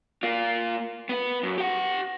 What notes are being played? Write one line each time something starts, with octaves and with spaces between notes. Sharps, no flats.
A#3 F4
B3 B4
F#2
G4 F#5